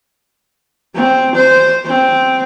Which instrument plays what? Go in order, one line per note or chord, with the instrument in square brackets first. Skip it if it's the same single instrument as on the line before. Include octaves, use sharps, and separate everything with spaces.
[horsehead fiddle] C4
C5
C4